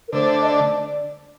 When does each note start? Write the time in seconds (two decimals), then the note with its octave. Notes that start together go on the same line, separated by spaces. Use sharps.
0.08 A#4
0.13 D3 A3 D4 C5
0.41 D#5
0.47 D5